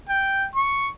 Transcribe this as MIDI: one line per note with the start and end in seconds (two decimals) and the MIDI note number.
0.09 0.46 79
0.56 0.88 85